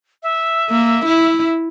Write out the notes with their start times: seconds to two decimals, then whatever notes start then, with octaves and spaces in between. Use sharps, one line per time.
0.23 E5
0.70 A#3
1.05 E4